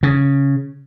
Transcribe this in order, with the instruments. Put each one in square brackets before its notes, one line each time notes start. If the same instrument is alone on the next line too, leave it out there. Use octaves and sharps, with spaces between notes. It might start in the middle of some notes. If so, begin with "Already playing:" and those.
[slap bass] C#3